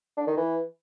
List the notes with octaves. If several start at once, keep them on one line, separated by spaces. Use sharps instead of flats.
D4
D#3
E3